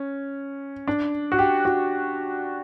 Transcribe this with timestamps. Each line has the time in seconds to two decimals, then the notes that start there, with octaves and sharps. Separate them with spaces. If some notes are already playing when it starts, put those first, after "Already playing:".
Already playing: C#4
0.88 D4
1.32 F#4
1.39 G4
1.65 F#4